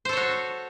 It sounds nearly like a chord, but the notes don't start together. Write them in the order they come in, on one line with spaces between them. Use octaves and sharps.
C5 A4 C#5 F#4